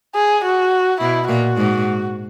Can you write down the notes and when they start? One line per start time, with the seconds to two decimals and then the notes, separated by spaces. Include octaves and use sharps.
0.15 G#4
0.44 F#4
1.00 B2 E4
1.29 A#2 F#4
1.57 G#2